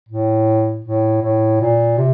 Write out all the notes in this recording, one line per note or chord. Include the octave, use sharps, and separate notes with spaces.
A2
A2
A2
A#2
C3